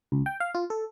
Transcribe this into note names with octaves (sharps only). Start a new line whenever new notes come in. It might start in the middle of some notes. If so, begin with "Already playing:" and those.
C#2
G5
F5
F4
A4